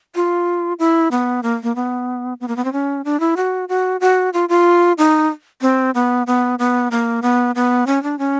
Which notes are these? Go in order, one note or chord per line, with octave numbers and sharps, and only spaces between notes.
F4
E4
B3
A#3
A#3
B3
B3
A#3
B3
C4
C#4
D4
E4
F#4
F#4
F#4
F4
F4
D#4
C4
B3
B3
B3
A#3
B3
B3
C#4
D4
C#4